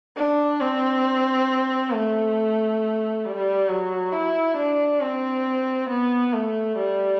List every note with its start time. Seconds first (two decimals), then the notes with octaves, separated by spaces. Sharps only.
0.17 D4
0.61 C4
1.93 A3
3.25 G3
3.69 F#3
4.13 E4
4.57 D4
5.01 C4
5.89 B3
6.33 A3
6.77 G3